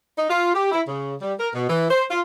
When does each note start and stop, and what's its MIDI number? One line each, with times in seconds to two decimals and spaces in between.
0.17 0.28 63
0.30 0.54 65
0.55 0.71 67
0.72 0.81 64
0.87 1.16 49
1.21 1.34 55
1.40 1.49 70
1.54 1.70 47
1.70 1.88 52
1.90 2.04 72
2.11 2.20 65